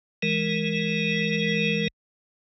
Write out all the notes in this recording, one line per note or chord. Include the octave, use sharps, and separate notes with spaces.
E3 G#3 A#4